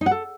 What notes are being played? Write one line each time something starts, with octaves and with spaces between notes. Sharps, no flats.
D#4
F#5
A4